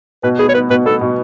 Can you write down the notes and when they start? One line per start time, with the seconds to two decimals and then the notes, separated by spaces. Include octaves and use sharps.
0.23 B2 B4
0.39 B3 G#4
0.49 C#5
0.54 B3 B4
0.70 B2 B4
0.86 B3 A4
1.01 B2